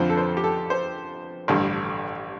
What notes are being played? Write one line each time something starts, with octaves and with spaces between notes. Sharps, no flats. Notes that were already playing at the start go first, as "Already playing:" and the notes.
Already playing: F2 D3 F3 C5
A4
C5
G4
A4
C5
A1 G2 D3